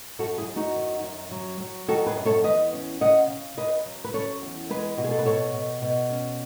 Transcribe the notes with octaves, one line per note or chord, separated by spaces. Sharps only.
F#2 F#4 A4
E4 G#4
F#2
D#4 F#4
D#3
F#2
F#3
F#3
D#3 F#4 A4
G#4 B4
F#2
A4 C#5
E2 B4 D#5
C#4
C#3 D#5 F#5
C#3
C#3 B4 D#5
F#3
B4
C#4 A4 C#5
E2
G#3 G#4 B4
B2 F#4
G#4
A4
B4
B2 A4 C#5
B2
B2
C#4